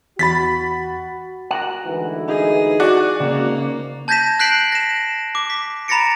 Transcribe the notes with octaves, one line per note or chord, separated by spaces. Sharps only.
E2 F#4 B5 A6 B6
F#4 A#4 F#5
D2 G#2 E3
D#4 G#4
F#4 D5
G#1 C#3 A#3
A5 G6 G#6 A#6 B6 E7
F#6 G6 B6 C7 D7 F#7
A#6 E7
D6
B6
A#5 B5 A6 A#6 C#7 D7